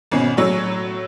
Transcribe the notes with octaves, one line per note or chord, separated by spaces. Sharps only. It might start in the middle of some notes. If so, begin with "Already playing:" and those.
G#1 B2 C#4
A2 F#3 C#5 E6